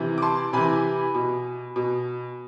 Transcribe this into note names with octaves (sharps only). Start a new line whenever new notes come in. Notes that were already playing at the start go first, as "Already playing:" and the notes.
Already playing: C3 E3
D6
A5 C6
C3 E3 G#5 B5
B2
B2